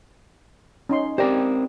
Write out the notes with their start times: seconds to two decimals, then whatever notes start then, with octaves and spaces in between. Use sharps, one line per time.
0.89 C#4 D#4 C6
1.18 C4 G4 A#4 C5 D5